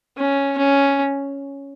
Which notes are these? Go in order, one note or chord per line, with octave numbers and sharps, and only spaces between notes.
C#4
C#4